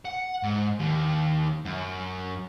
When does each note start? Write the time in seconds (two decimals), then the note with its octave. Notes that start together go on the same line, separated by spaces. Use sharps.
0.05 F#5
0.43 G#2
0.79 D#2
1.66 F#2